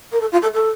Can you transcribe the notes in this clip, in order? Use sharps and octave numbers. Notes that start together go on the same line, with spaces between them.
A#4
A4
F4
A4
A4